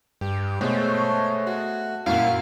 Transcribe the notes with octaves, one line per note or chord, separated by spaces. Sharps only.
G2 G4
B2 G#3 A3 C5 C#5
F#4
F#2 A#2 E4 F#4 F5